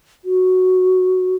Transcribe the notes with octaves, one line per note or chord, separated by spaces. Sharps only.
F#4